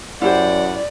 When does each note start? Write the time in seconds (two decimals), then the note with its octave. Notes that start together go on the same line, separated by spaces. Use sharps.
0.22 F#2 E4 G4 C5 D5 F#5